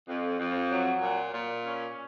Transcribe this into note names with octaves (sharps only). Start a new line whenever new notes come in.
F2
F2
F#3
A#2
A#2
C#4